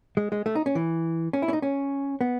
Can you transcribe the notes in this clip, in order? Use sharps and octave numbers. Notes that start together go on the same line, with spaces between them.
G#3
G#3
A3
D#4
C#4
E3
C#4
E4
C#4
D#4
C#4
B3